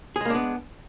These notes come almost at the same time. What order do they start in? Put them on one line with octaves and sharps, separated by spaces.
G#4 G#3 A#3 D4 B3